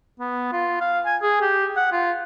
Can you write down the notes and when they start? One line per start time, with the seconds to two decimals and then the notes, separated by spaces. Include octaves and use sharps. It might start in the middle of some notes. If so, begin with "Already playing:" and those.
0.19 B3
0.52 F4
0.81 F5
1.06 G#5
1.22 G#4
1.42 G4
1.77 F#5
1.92 F4